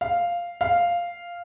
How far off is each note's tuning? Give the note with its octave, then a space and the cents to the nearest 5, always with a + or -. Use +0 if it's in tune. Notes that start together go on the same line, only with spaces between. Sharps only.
F5 -5
F5 -5